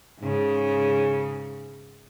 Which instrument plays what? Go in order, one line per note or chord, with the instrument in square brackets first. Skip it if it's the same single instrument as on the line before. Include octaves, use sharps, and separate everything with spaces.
[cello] G#2 C#3